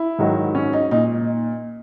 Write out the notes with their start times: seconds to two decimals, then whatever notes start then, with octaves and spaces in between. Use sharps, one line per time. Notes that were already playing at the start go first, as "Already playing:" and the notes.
Already playing: E4
0.19 G#2 D#3 F#3
0.55 C#4
0.73 D#4
0.91 A#2 D#4